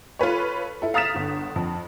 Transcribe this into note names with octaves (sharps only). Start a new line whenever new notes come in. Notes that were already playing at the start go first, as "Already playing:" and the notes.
F4 A4 B4 C#5
E4 A4
F5 A#5 D#6 A6 B6 E7
G1 D3
F2